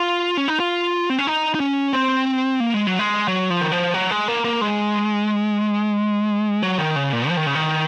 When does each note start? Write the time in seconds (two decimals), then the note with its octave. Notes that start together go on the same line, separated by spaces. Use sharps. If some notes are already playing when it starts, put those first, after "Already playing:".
Already playing: F4
0.37 C#4
0.48 D#4
0.60 F4
1.10 C4
1.18 C#4
1.27 D#4
1.55 D#4
1.60 C#4
1.93 C4
2.60 A#3
2.74 G#3
2.87 F#3
2.99 G#3
3.28 F#3
3.50 F3
3.61 D#3
3.72 F3
3.94 F#3
4.11 G#3
4.28 A#3
4.44 A#3
4.61 G#3
6.63 F#3
6.78 D#3
6.96 C#3
7.13 A#2
7.29 F3
7.37 D#3
7.47 C#3
7.55 D#3